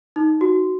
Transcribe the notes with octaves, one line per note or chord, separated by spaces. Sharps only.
D#4
F#4